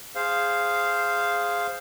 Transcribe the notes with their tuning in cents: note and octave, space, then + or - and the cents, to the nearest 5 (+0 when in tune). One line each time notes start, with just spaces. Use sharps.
G#4 -5 C5 +0 F5 -5